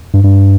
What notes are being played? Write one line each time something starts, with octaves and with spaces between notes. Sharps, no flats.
G2
G2